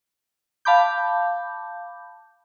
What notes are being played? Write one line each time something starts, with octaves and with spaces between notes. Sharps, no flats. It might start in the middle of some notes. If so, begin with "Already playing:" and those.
F5 A5 B5 D6 G6